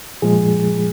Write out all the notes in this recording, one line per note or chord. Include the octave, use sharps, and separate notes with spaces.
A#2 F3 G#3 G#4